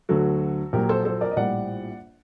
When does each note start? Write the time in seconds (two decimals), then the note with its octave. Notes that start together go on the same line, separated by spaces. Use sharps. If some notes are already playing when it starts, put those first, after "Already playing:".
0.09 D2 D3 F#3 F#4 A4
0.73 A#1 A#2 F#3 G4 A#4
0.89 A4 C5
1.05 A4 C5
1.21 A#4 D5
1.31 D#5
1.37 A#1 A2 G3 D5 F#5